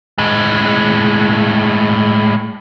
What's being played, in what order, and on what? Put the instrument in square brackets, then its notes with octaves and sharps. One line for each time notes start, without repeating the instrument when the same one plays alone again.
[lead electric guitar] A2 G#3